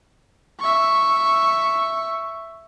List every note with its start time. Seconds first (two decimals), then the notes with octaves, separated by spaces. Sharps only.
0.60 E5 C#6